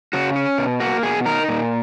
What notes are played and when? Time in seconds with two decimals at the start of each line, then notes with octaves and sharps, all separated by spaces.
0.13 C#3 F#4
0.36 C#4
0.58 B2
0.80 A#3 F#4
1.03 B2 G#4
1.26 D#4 A#4
1.49 A#2